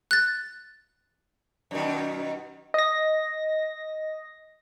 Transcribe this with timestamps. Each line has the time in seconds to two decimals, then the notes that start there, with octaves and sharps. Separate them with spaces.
0.11 F#6 A6
1.71 F#2 B2 D#3
2.74 D#5 A#6